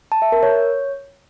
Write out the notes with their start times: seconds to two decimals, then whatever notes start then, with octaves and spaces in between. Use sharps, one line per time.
0.12 A5
0.22 E5
0.32 A#4
0.43 C#5